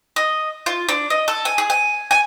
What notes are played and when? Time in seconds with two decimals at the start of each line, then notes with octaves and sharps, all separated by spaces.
0.16 D#5
0.66 F4
0.89 D4
1.10 D#5
1.28 A4
1.45 G#5
1.58 G#4
1.70 G#5
2.11 G#5